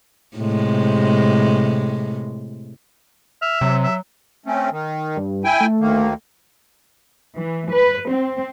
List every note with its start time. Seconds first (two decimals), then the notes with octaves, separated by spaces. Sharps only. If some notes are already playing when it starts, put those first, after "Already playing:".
0.38 A2 C3 G#3
3.42 E5 F6
3.61 C3 F#3
3.83 E5
4.46 A3 C4 C#4
4.71 D#3
5.17 G2
5.44 E4 G5 G#5
5.60 A3
5.80 D2 D#3 A#3
7.36 E3
7.71 B4
8.09 C4